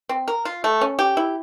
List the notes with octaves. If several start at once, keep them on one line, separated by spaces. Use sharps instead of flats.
C4
A#4
F4
A3
C#4
G4
E4